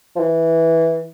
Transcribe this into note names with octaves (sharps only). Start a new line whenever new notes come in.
F3
E3